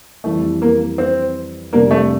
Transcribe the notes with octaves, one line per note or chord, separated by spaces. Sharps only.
F2 E3 G3 A3
A#3
C4
F2 C3 G3 A#3 D4 G4
A3